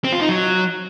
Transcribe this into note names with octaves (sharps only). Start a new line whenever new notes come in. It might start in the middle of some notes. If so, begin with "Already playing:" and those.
C4
F4
D#4
F#3